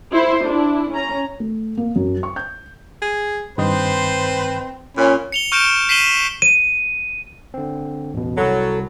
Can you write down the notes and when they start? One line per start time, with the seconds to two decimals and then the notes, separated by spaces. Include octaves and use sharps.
0.12 E4 C5
0.45 D4 E4
0.90 C#4 A#5
1.40 A3
1.77 A#3
1.96 F#2
2.23 C#6
2.36 G6
3.02 G#4
3.58 G2 D#3 C4 B4 C5 D#5
4.97 A#2 C#4 B5
5.32 C#7 F7 G7
5.52 C#6 F6 G6 C#7 D7 E7
5.89 B6 C7 D#7 E7 F#7 G7
6.42 D#7
7.54 D3 C4
8.14 A1 E2 B2
8.38 C2 F#3 A4 B5